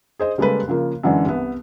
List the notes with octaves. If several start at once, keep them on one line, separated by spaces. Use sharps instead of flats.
G#4 C5 D#5
C#3 G3 G#3 A#3 A4 B4
C#3 F3 A#3
F#2 D3 E3 G#3 D4
C2 B3